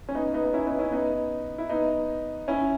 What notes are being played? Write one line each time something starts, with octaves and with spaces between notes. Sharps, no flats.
C#4
B3 D#4
B3 D#4
B3 D#4
C#4 E4
B3 D#4
C#4 E4
B3 D#4
E4
B3 D#4
C#4 E4